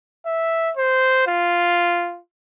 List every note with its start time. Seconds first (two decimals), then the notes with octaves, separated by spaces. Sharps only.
0.26 E5
0.77 C5
1.27 F4